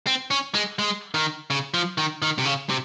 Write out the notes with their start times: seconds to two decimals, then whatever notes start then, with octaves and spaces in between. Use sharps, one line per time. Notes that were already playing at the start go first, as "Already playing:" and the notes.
0.07 C4
0.31 C#4
0.54 G#3
0.79 G#3
1.14 D#3
1.50 C#3
1.74 F3
1.98 D#3
2.22 D#3
2.38 C3
2.45 C#3
2.69 C3